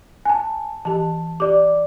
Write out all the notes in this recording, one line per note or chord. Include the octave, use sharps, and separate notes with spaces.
G#5 A5
E3 G4 A5
G4 D5 D6